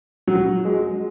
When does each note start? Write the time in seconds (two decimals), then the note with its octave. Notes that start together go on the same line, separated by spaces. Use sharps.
0.27 F#3
0.65 G#3